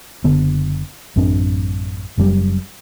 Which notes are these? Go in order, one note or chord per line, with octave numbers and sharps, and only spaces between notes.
F#1 D3 B3
A1 F#2 C4 D4
F#1 F#2 B2 G3